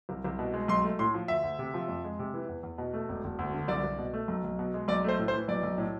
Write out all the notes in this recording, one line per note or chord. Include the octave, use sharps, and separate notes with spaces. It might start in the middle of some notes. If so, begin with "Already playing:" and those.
C2
C2
B2
G#3
B1 C6
A3
A2 C6
F3
D2 E5
D2
C3
F3
F2
G#3
C3
E3
E2
E2
B2
A3
E1
E1
D2
D3
C2 D5
C2
B2
A3
B1
B1
B2
G#3
B1 D5
A3 C5
A2
C5
E3
B1 D5
B1
A2